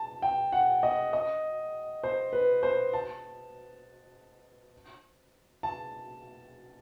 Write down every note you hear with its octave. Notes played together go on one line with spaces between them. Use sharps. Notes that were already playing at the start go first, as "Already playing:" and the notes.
Already playing: A5
G5
F#5
D#5
D#5
C5
B4
C5
A5
A5